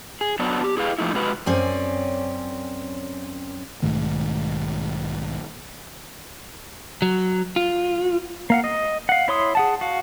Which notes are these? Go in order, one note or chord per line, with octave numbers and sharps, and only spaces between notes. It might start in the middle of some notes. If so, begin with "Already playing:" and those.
G#4
F#3 B3 D4 F#4
G4
E4 G#4 B4 F5
F2 A#2 F3 A3 D#4 E4
C3 G#3 F#4 B4
F#2 C4 C#4 D5
B1 G#2 D#3 A3
F#3
F4
A#3 F5 F#5
D#5
F5 F#5
E4 C#5 C6 D#6
G#4 F#5 A5
F#4 F5